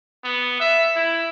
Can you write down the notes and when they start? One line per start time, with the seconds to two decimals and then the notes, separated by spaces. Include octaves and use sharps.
0.24 B3
0.60 E5
0.96 E4